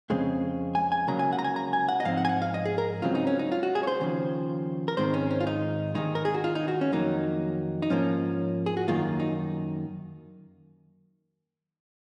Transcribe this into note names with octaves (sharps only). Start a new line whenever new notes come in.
F2 C#3 G#3 C4
G#5
G#5
C#2 C#3 F#3 A#3 A#5
G#5
F#5
A#5
G#5
A#5
G#5
F#5
D#5
G#2 F3 C4 F5
F#5
G#5
F#5
F5
D#5
G#4
A#4
C#2 C#3 F#3 C4 F4
D#4
C#4
D#4
F4
F#4
G#4
C#5
C5
D#2 C#3 F3
A#4
G#2 D#3 G#3 C4 C5
C#4
C#4
F4
D#4
D#2 D#3 G#3 D#4
A#4
G#4
F#4
F4
D#4
F#4
C#4
F2 D#3 F#3 A#3 D#4
D#4
G#2 F3 A#3 C#4
G#4
F#4
F#2 D#3 A#3 F4
D#4